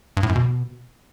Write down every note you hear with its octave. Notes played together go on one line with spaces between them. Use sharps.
G2
A2
F#2
B2